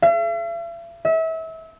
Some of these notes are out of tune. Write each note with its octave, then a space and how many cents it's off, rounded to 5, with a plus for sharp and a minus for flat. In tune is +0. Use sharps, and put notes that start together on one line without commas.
E5 +45
E5 -30